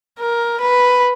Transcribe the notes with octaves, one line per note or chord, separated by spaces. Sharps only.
A#4
B4